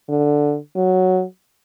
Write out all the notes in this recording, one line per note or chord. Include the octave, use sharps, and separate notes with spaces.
D3
F#3